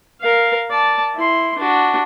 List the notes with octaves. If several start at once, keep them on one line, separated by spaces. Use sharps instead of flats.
A#4 F5
D5 A5
E4 C6
D4 F#4